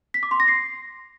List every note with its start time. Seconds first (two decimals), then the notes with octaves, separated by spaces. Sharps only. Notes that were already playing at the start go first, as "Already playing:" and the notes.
0.14 B6
0.23 D6
0.31 C6
0.40 A#6
0.48 C7